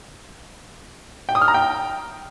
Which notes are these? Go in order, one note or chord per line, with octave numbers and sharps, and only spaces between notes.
G5
D#6
F6
A#5
G5